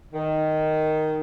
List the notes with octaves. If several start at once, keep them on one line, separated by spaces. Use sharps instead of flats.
D#3